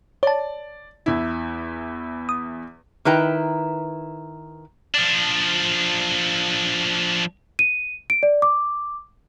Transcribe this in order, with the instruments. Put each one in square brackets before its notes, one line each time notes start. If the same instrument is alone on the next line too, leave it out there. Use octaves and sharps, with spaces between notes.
[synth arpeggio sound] C#5 A5 [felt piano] D5
[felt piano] E2 E4
[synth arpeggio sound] D#6
[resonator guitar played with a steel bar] D#3 E4 B4 G5 A#5
[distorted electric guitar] F3 D4
[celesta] D#7
D7
D5
D6